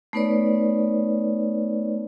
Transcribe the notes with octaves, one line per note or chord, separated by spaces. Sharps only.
A3 B3 D#4 B4 C#5 D5